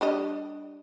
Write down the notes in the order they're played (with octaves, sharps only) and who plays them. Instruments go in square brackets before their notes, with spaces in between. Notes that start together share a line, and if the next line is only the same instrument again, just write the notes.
[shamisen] G3 D4 D#5